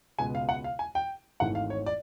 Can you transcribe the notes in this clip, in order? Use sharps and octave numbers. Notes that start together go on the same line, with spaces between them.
C#2 B2 G#3 B3 G#5
F5
F#5
F5
G#5
G5
G#1 G#2 E3 A3 F#5
F5
C#5
D5